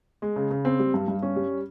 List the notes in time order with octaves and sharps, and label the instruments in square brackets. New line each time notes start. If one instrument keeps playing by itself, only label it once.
[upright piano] G#3
C#3
C#3
C4
G3
G2
G2
C#4
G3